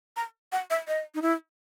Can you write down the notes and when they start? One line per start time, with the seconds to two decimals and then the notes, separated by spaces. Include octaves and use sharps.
0.17 A#5
0.52 F#5
0.70 E5
0.88 D#5
1.15 D#4
1.22 E4